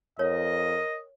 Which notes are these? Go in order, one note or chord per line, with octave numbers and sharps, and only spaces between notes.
F2 A#4 C#5 D#5